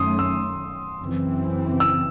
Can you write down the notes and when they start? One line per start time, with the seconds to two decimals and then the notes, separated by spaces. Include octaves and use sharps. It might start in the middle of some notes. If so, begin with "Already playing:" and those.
Already playing: F#2 D#3 A3 C#4 C6 D#6
0.19 E6
1.00 F#2 C#3 E3 C4
1.80 E6